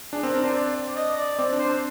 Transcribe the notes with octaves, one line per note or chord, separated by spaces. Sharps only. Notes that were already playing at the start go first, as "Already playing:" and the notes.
D4 G#4
C4 A#4
D4 A#4
D4 C5
D5
D5
D#5
D5
C4 D5
D4
C5
D4